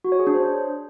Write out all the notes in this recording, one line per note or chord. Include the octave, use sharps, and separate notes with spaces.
F#4
C#5
G#4
D4
C5